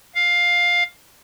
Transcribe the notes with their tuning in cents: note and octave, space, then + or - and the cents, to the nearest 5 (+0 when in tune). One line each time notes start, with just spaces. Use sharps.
F5 +10